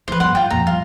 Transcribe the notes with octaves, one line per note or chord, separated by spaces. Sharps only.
D#3 F3 B4 C5
G1 G3 F#5 C6
G2 F4 G5
F2 A#2 A#5
G3 F4